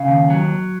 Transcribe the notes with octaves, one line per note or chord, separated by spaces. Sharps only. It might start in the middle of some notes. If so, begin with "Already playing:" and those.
Already playing: C#3 F5
D#2
F#3